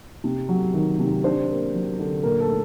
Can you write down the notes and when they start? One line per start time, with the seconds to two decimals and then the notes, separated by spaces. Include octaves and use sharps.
0.24 C3
0.49 F#3
0.74 D#3
0.99 C3
1.24 D4 C5
1.49 A#3
1.74 F#3
1.99 D3
2.23 A#2 A#4
2.40 A4
2.48 A3